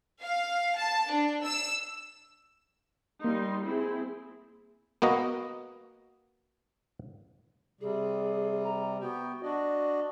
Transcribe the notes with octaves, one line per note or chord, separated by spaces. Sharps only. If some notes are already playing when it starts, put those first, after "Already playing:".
F5
A5
D4
E6
G3 A#3 D#4 C6
C4 E4 G#4
A#3 B3 F#4 D#5
C3 G3 G#4
A#5
B3 F#4 G5
D4 F#4 D5 D#5